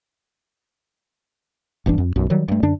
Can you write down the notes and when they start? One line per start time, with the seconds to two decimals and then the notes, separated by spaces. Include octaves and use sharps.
1.86 D1 G1 E3 D4
1.98 F2
2.16 B1 F#2
2.30 D#3 F#3 G3
2.48 G2 A3
2.63 F#2 D3 D4